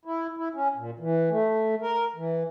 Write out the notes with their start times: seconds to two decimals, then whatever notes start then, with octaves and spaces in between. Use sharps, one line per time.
0.05 E4
0.37 E4
0.54 C#4
0.77 A#2
0.99 E3
1.30 A3
1.82 A#4
2.16 E3